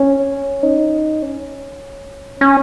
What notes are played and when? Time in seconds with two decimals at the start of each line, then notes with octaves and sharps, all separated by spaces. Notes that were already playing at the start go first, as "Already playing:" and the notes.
Already playing: C#4
0.63 D#4
1.22 C#4
2.41 C#4